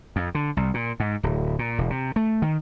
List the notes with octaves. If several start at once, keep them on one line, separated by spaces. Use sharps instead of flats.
F2
D3
C2
A#2
G#2
D1
A#2
E1
C3
A3
D#3